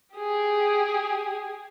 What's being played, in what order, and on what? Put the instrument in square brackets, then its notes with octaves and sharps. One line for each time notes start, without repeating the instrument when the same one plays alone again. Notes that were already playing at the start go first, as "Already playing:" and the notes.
[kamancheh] G4 G#4